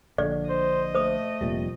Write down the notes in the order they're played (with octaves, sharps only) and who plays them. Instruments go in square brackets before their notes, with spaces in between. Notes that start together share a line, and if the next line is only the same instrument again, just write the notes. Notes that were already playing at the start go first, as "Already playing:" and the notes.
[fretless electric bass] A#1 D3 [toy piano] D5
[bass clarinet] C5 [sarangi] D#5
[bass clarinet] A3 [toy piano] C5 D#6
[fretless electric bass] F1 A#2 G3